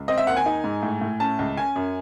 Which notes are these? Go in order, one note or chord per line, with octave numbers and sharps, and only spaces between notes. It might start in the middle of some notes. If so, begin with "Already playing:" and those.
Already playing: C#2
C4 D#5
E5
D#2 F#5
G#5
D#4
G#2
A2
A2
C#4 A5
C#2
C#4 G#5
F#2